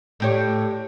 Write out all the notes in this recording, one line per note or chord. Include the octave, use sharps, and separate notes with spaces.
A2 G4 C#5